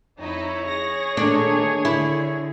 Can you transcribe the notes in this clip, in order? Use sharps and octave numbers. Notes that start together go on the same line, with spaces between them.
F2 D#4 E4 C#5
G#4 A#6
A#2 D#3 A3 D4
D3 E4